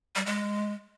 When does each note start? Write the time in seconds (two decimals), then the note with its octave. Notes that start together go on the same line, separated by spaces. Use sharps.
0.16 G3
0.26 G#3